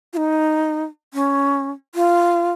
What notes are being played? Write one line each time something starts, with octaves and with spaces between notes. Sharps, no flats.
F4
D#4
C#4
F4